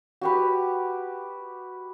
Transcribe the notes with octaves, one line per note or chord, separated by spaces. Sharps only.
F#4 G4 B4